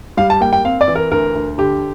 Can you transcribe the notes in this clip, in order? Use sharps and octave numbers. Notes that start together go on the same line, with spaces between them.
G3 F5
A5
A#3 G5
G5
C4 F5
D5
E3
A#4
D2 A#4
D2
D3 G4